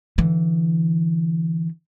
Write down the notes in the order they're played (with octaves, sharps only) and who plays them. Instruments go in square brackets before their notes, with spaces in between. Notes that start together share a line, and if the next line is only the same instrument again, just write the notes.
[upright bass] D3 E3